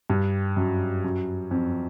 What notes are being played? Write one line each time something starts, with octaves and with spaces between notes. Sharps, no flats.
G2
F#2
F#2
F2